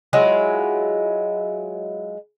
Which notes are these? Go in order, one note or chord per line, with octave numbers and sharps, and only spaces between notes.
F#3 G#3 E4 F4